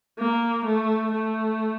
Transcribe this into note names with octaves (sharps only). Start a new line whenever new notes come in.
A#3
A3
A3